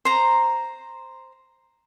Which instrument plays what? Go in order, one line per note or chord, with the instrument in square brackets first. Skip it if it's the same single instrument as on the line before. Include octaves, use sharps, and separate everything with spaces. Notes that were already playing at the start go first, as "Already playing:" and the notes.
[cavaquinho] C5 A#5